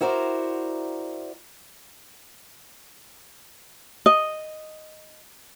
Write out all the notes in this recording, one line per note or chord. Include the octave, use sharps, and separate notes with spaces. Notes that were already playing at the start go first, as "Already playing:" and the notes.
E4 F#4 A#4 C5 D5
D#5